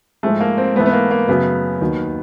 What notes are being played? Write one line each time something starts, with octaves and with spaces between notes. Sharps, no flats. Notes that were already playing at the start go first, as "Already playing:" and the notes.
G#2 F3 G#3 A3
A#3
C4
G#2 E3 A3 B3
B3
A#3
A#3
F#2 C#3 F#3 A3 B3
D#2 D#3 F#3